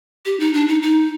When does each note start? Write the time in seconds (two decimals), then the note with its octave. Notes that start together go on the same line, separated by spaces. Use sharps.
0.26 G4
0.40 D#4
0.54 D4
0.68 D#4
0.82 D#4